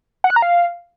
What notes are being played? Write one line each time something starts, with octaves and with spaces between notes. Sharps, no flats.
F#5
F#6
A#5
F5